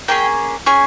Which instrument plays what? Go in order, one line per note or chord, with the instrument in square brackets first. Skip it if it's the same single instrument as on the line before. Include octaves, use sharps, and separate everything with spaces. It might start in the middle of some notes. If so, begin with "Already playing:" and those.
[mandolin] A#3 C#4 G#4 G5
C#4 G#4 G#5